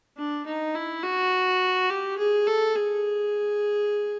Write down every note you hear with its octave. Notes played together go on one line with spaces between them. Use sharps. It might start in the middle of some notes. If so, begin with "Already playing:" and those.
D4
D#4
E4
F#4
G4
G#4
A4
G#4